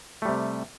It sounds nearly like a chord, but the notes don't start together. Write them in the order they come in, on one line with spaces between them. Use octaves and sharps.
A3 G3 C3